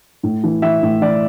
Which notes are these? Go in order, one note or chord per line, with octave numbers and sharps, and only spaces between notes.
A2
E3
E3 E5
A2
E3 D5